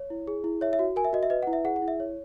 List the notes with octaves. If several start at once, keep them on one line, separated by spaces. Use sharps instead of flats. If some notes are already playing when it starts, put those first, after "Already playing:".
Already playing: C#5
E4
G#4
E4
C#5 E5
E5
F#4
A#4 G#5
E5
F#4 D#5
E5
B4 D#5
F#5
E4
E5
G#4 F#5
F#5
E4
E5
C#5